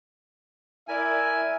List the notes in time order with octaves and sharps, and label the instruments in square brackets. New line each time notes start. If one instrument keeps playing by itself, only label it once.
[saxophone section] E4 A#4 D5 [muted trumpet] E5 [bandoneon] G#5